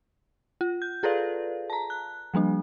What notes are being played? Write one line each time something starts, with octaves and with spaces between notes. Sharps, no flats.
F4
G6
F4 G#4 A4 B4 D5 F5
A5 A#5
F#6
F3 G3 A#3 D4